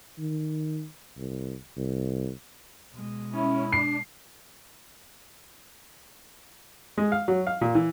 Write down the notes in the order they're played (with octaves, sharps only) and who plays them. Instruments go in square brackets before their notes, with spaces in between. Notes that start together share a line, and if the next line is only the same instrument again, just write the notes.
[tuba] D#3
C2
C2
[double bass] B2 G#3
[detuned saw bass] C#4 [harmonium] E4
[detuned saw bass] D4 [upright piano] C7
[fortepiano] G#3
F5
F#3
F5
A#2
E3